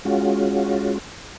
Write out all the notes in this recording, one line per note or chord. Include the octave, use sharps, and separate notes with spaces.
G#3 C#4 F4 F#4